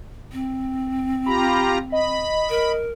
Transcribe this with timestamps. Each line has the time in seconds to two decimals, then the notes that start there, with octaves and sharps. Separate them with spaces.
0.33 C4
1.26 F4 G4 A#5 B5
1.92 D#5 B5
2.50 A#4